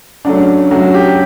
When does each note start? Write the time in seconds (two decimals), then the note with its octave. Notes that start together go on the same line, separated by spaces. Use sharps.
0.25 C#3 F#3 A3 D4
0.71 C#3 F#3 A3 F#4
0.94 G4